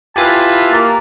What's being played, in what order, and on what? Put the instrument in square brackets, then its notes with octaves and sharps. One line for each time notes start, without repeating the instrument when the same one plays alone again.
[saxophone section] E4 F4 B4 [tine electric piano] G4 G#5 A6 [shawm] A5
[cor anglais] A#3